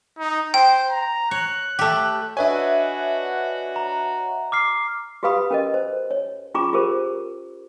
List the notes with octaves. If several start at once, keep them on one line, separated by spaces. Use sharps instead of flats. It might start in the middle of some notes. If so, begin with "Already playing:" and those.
D#4
C5 G5
A#5
C#5 F#6
A3 G4
D4 F#4 B4 C#5 D#5 E5 G#5
A#5
D6 F6 C7
F#4 G4 B4 F5 B5 D#6
C#4 A#4 D#5
C5
C#5
C#4 F4 G#4 A#5 C#6 D6
F4 G4 G#4 A#4 C5